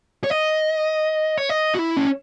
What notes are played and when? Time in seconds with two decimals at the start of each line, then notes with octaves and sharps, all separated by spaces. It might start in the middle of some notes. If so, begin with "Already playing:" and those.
0.24 C#5
0.30 D#5
1.37 C#5
1.49 D#5
1.75 F#4
1.79 E4
1.97 C#4